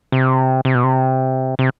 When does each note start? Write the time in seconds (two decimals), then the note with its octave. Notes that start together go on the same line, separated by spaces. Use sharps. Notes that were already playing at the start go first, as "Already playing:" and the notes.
0.12 C3
0.65 C3
0.75 B2
0.84 C3
1.59 C3